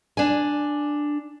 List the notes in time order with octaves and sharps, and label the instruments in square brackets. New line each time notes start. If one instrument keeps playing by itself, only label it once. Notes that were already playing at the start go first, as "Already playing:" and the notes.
[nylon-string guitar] D4 G#5